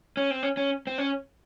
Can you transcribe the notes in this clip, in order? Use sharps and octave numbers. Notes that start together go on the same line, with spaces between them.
C#4
C4
C#4
C#4
C4
C#4